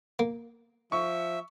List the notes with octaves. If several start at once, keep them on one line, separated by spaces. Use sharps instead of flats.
A#3
F3 E5 C#6